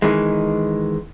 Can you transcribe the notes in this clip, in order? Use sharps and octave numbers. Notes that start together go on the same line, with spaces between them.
D#3 E3 G#3